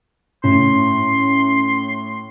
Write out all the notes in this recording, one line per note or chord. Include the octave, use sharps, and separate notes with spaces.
A2 C#4 C6